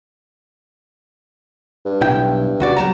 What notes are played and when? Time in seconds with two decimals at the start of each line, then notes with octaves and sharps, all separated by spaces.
1.86 G2
2.01 B1 E4 G5
2.60 C#2 F#4 D5
2.76 F#3 G3 A5 A#5